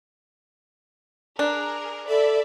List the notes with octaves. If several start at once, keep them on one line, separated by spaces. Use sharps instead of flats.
D4 G#4 A#4
A4 D5 E5 B5